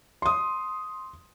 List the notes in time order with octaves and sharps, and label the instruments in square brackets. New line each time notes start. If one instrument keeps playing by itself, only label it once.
[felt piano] C6 D#6